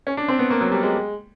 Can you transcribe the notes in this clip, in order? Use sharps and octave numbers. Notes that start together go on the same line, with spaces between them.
C#4
D4
C4
B3
A#3
F#3
G3
G#3